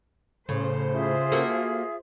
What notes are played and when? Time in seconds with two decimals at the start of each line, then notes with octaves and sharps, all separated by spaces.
0.49 A2 C#3 C5
0.93 F4 G#4 E5
1.32 A#3 F#4 A4